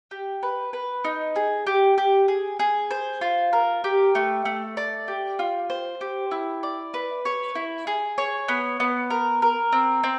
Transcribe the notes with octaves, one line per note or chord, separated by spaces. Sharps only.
G4
B4
B4
D#4
G#4
G4
G4
G#4
G#4
C5
F4
A#4
G4
A3
A3
D5
G4
F4
C5
G4
E4
D5
B4
C#5
E4
G#4
C#5
B3
B3
A#4
A#4
C4
C4